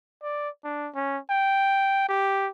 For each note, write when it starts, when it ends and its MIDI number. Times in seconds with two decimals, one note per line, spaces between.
0.23 0.49 74
0.64 0.89 62
0.95 1.18 61
1.30 2.04 79
2.09 2.49 67